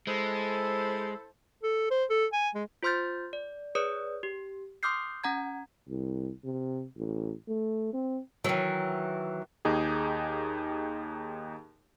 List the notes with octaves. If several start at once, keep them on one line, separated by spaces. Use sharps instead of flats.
G#3 E4 A4 C5
A4
C5
A4
G#5
G#3
F4 C5 C6 F6 G6 A6
D5
G#4 B4 C#5 D5 D#6
G4
C6 D6 D#6 F6 G6 C7
C#4 F#5 A#5 G#6
C2
C3
A1
A3
C4
D#3 E3 F#3
D#2 D#4 G4 G#4